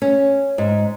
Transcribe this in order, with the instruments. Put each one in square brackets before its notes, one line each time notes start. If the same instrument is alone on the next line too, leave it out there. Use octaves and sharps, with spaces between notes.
[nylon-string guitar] C#4
G#2